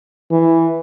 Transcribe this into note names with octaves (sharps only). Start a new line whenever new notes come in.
E3